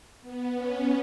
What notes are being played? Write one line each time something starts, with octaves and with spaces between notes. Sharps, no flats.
B3
C#4